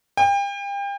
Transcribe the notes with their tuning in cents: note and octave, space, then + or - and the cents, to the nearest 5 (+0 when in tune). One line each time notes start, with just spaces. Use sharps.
G5 +35